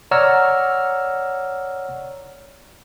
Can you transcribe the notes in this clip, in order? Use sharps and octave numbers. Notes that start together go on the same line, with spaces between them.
C#5 D5 F#5 A#5 E6 F6